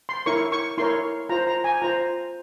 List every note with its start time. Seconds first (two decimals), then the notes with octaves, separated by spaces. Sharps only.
0.09 C6
0.26 E4 A#4 C#5 C#6
0.52 C#6
0.78 E4 A#4 C#5 C6
1.29 F4 C5 A#5
1.47 A#5
1.64 G#5
1.82 F4 C5 A#5